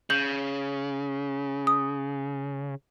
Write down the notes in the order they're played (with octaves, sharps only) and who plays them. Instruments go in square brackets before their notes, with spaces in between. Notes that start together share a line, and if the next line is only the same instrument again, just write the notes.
[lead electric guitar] C#3 [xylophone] G6 F#7
[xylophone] D#6